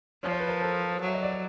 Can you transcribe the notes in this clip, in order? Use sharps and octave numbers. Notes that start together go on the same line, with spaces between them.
F3 C#5
C5
B4
A#4 C5
A4 B4
F#3
E5
D#5
D5
C#5